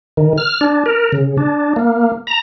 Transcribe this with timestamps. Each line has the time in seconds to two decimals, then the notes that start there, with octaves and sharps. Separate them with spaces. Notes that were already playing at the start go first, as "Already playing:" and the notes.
0.17 D#3
0.38 F6
0.61 D4
0.86 A#4
1.12 C#3
1.38 D4
1.76 A#3
2.27 A#5